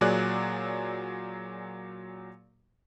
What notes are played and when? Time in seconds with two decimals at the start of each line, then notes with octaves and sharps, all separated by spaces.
0.01 A#2 F#3 G#4 D5 F#6